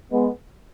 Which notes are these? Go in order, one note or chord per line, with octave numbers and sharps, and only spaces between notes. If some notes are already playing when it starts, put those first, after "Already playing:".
G#3 B3